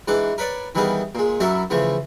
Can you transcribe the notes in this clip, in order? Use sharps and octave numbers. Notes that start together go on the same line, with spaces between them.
G#2 E3 D4 F#5 D6
A#4 B4 C#5 D5
D#3 E3 G3 B3 G#4 A#4
A#2 G#3
F#2 F#3 E4 A4 A#4 E5
C#3 E3 F3 A3